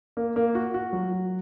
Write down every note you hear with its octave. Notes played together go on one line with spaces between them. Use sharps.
A#3
A#3
F#4
F#4
F#3
F#4